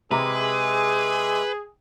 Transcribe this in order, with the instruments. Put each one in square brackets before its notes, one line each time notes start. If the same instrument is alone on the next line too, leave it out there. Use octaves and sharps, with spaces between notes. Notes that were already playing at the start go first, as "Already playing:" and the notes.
[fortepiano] C3 A#5 [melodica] G#3 E5 D6 [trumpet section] G#4 [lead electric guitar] B4